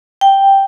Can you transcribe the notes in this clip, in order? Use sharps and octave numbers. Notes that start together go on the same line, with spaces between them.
G5